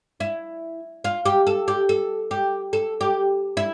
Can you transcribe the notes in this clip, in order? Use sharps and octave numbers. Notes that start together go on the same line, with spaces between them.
E4
F4
G4
A4
G4
A4
G4
A4
G4
E4